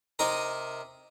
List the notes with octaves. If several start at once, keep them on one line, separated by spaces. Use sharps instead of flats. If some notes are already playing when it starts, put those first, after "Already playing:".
C3 D#4 A#4